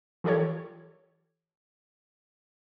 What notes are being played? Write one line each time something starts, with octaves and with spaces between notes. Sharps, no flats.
E3 F4 G4 A4 C#5